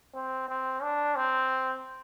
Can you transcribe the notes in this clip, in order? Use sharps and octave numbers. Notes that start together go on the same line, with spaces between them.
C4
C4
D4
C4